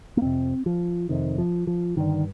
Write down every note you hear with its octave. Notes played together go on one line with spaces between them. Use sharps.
A#3
F2 C3 C4
F3
F2 C3 D#3
F3
F3
G2 D3 D#3